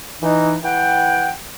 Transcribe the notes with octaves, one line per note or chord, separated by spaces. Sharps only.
E3 D#4
E3 F#5 G5